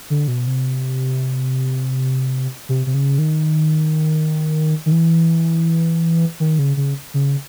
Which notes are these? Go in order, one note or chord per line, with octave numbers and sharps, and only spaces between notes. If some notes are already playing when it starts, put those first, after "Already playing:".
D3
B2
C3
C3
C3
C#3
D#3
D#3
E3
D#3
C#3
C#3
C#3